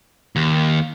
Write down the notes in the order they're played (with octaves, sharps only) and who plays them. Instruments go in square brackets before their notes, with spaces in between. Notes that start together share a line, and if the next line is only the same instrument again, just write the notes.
[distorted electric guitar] D#2